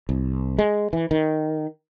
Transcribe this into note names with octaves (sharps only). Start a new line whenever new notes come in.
C2
G#3
E3
D#3